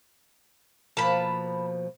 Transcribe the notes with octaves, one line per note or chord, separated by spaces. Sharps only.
B2 F3 A#3 A5 B5